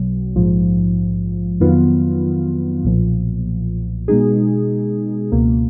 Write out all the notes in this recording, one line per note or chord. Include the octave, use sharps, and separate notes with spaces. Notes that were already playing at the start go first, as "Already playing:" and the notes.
Already playing: B1 B2 F#3
A#1 G#2 F3
F2 D#3 F#3 B3 F4
B1 A#2 F3
B2 G#3 D#4 G#4
C#2 B2 A#3